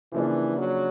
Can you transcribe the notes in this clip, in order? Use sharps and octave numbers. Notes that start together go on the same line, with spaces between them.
C#3 E3 F3 A#3 D4
F#3